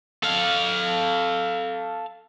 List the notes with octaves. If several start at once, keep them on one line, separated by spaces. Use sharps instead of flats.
A4 F5